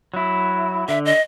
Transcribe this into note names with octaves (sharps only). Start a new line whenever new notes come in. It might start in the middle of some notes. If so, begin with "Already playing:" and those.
F#3 E4
D3 E5
D#5